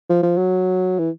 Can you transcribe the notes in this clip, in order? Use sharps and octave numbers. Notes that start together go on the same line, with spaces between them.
F3
F3
F#3
E3